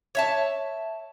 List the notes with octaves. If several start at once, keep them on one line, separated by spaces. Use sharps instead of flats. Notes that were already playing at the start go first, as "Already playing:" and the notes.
C#5 E5 A5